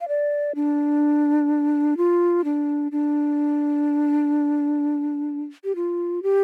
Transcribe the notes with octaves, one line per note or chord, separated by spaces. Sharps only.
F5
D5
D4
F4
D4
D4
G4
F4
G4